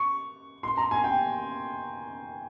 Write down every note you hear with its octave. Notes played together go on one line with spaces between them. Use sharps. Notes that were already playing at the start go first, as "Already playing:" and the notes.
Already playing: C#6
C6
A#5
G#5
G5